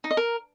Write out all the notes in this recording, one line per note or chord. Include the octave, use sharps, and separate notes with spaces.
D#4
D#5
A#4